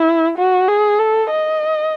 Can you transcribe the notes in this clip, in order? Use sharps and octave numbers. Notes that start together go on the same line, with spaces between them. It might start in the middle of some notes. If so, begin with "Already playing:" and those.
Already playing: E4
F#4
G#4
A4
D#5